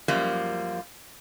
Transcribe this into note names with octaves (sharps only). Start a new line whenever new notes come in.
F#2 F3 G3 A#3